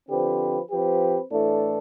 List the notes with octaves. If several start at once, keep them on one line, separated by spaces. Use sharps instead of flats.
D3 F3 C4 G4 B4
F3 C4 G4 B4
A2 E3 A3 D4 A4